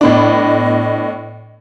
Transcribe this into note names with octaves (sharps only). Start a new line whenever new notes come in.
A2 B3 D4 D#5